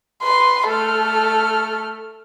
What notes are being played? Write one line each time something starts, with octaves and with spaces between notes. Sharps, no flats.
B4 C6
A3 A4 F6